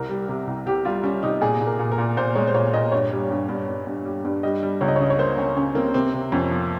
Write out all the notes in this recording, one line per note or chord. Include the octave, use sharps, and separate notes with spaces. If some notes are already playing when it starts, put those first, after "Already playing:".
Already playing: C2 A#4
G3
C3
C2
C2 G4
G3 F4
G3 C#4
C3 D#4
A#2 G#4
A#2
A#4
A#2
A#4
A#2
A#2 C5
G#3 C#5
C5
A#2 C#5
A#2 D#5
G2 C#5
G3
G2
G2
G2
G2
G3
G2
G3 D#5
G3
C#2 C#5
D#5
C#5
C#3 D#5
C#5
A#3 C5
C#2 C#4
C#3 C#4
A#3 C4
C3 C4
C3
F2 C#4
F3